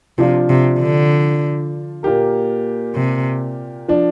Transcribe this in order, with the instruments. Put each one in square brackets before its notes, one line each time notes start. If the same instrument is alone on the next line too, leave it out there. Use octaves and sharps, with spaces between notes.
[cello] C3 [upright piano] F3 D4 F4
[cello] C3
D3
[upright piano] A#2 A#3 G4 A#4
[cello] C3
[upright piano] F3 D4